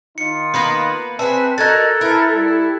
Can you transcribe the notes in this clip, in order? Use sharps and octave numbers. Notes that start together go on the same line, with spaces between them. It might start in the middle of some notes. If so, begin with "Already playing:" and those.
D#3 D#4 F4 C#7
A#3 B3 B4
C4 G#4 B4 E5 A5
D#4 F#4 A4 A#4 F#6 G#6 A6
E4 A#4 B4
G3 E4